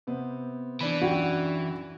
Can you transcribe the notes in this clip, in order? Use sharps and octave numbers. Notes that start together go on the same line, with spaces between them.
C3 B3 C4
E3 D4 D5 B5
F#2 F#4 G5